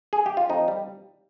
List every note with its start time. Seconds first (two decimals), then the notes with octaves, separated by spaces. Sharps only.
0.13 G#4
0.26 G4
0.37 F4
0.49 F2 D#4
0.68 G3